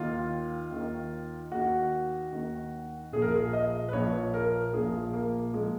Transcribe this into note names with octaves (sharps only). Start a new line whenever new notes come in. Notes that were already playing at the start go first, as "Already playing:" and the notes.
Already playing: D#2 D#3 F4
D#2 D#3
D#2 D#3 F#4
D#2 D#3
A#1 A#2 F3 G#4
A#4
G#4
D#5
B4
A#1 A#2 F3 C#5
A#4
A#1 A#2 F3 G#4
A#3
A#2 F3 G#3